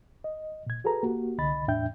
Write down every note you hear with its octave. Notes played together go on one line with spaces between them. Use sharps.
D#5
A#2 G#6
F#4 G#4 A4 B4 A#5
A#3 F#4 G4
C2 D3 D#5 B5 A6
E2 A2 D4 E5 G5 G6